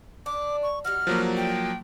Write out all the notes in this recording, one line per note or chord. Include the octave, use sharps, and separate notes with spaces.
D4 D6
C#6
G3 D#4 F#4 F6
F3 F#3 A#3
G5